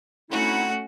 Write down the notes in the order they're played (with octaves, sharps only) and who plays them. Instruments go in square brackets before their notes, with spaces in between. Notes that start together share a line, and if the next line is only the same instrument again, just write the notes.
[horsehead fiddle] A3 F#5 [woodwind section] C4 D#4 E4 [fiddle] C#4 F#4